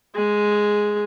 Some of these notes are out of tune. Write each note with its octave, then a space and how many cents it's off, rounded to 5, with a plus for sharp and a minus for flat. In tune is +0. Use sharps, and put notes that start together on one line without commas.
G#3 +0 G#4 +0